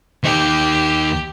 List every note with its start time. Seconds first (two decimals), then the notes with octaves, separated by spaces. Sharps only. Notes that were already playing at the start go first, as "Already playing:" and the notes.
0.23 D#2 D#4 G4